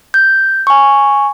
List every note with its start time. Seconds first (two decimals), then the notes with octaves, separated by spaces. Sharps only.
0.14 G6
0.67 G#5 C#6